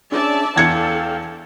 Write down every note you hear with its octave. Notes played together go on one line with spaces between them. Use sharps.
C#4 D4 G#4 D5 E5 A5
E2 D4 A4 F5 G5 G#6 C#7